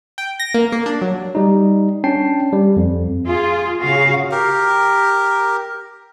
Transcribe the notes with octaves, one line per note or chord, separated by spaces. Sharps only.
G5
A#6
A#3
A#3
D4
F#3
G3 D#4
C#4 D4 G5 A5 C7
G3
F2
F4 G#4
C#3 F#4 G#4 F5
G4 A#4